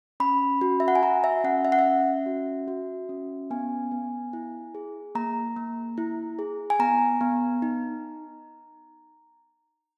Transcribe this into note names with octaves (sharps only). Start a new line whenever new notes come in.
C#4 B5
F#4
E5
F#5
G#5
F#4 A#5
E5
C#4 F#5
E5
F#5
E5
C#4
F#4
F#4
C#4
B3 G#5
B3
E4
G#4
A#3 A#5
A#3
E4
G#4
G#5
B3 A#5
B3
D#4